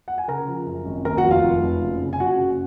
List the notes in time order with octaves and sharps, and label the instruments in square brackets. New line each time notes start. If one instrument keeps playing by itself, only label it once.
[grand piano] F#5
G#5
C#3 A#4 A#5
F3
F#2
G#1
D#2 A#4 A#5
F#4 F#5
F1
F4 F5
F1
F1
F#1
C#3
G#5
F#1 F#4 F#5
F#1